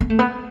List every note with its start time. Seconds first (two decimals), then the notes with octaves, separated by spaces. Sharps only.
0.01 B3
0.10 A3
0.19 B3